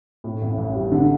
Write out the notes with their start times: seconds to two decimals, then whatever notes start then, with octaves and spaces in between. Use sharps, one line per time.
0.24 A2
0.42 A1
0.58 A1
0.75 G3
0.92 D3